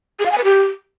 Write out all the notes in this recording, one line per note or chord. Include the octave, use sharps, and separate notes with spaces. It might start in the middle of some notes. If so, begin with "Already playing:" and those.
G#4
F5
G#5
B4
G4